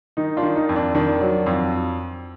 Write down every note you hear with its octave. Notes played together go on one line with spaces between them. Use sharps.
D#3 D#4
D4 F4
D#3
D#4
F2
D4
D#3 D4
F#3
F2